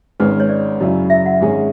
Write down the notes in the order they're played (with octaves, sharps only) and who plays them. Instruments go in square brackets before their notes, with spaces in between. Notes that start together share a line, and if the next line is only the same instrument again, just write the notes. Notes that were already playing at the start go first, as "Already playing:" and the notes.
[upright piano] G#1 G#2 G#3 C#4 [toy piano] B4
[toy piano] C#5
D5
[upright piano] F#2 C#3 F#3 C#4 E4
[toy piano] E5
F#5
[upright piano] G#1 G#2 G#3 C#4 G#4